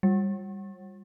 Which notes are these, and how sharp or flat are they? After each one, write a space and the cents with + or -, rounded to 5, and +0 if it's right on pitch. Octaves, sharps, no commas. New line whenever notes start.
G3 +10